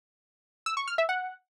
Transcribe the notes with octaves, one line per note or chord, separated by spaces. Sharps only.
E6
C#6
F6
E5
F#5